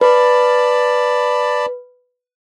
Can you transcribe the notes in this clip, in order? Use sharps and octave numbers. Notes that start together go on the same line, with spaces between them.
B4 D5 A5 B5